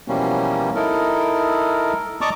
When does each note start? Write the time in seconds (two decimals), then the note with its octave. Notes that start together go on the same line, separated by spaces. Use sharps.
0.08 B2 E3 F3 G3 A#3 C#4
0.75 D#4 E4 A4 A#4
2.21 D5 D#5 A5 A#5 C#6 D6